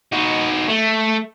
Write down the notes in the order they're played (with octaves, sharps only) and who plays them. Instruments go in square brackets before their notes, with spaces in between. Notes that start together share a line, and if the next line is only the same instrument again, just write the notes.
[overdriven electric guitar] D#4 F#4
A3